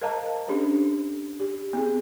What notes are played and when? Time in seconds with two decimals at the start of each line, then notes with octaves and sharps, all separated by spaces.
0.01 A#4 C5 D#5 F5 A5 A#5
0.48 C#4 D4 G4 A4 C5
1.40 G4
1.73 B3 C4 G#4